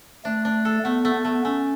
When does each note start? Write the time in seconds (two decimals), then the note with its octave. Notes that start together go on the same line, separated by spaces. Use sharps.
0.25 A3 D4
0.45 D4
0.65 A4
0.85 A3 B3
1.05 A3
1.15 B3
1.25 A3
1.44 A3 C#4